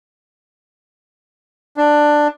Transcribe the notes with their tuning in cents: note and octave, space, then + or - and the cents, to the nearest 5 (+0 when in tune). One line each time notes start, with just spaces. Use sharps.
D4 +10